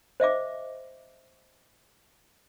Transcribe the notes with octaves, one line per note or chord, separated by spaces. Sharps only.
C5 D#5 E5 D6